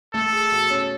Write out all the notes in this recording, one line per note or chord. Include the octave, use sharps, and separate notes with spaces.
A3 A4
G#4
B2
C#4